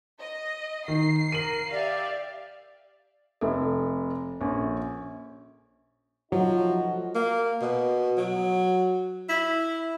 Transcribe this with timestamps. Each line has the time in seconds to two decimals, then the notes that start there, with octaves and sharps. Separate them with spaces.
0.20 D#5
0.88 D#3 C7
1.32 A#4 D#7 F#7
1.72 G4 D5 E5 F5
3.41 F1 A4 E5
4.40 A#1 C#4
6.32 F3 F#3 A3 D#4 F#4
7.15 A#3
7.61 B2
8.18 F#3
9.29 E4